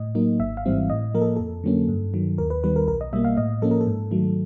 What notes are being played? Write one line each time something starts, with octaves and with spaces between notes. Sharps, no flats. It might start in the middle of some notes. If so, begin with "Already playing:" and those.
Already playing: A2 D#5
F#3 A#3 D#4
G#1 E5
F5
G#2 E3 G3 C4
A2 D#5
F3 A#3 A#4
A4
F2 A4
D3 F#3 A#3 C#4
G2
D#3 F#3
D#2 A#4
B4
D#3 G3 B3 B4
A#4
B1 A#4
D#5
B2 G3 A#3 E5
F5
A2 D#5
F3 A#3 C#4 A4
A#4
A4
G#2
D#3 F#3 A3